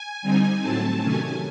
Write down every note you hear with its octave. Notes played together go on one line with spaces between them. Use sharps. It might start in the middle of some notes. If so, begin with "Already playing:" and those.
Already playing: G#5
D3 G3 C4 D#4
A2 F#3 A3 C4 A5
C3 D#3 F#3 A3 C#4 G#5